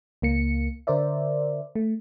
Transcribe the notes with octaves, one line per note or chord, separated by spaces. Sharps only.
C#2 A#3 C#7
D3 A#4 C5 D5 E5
A3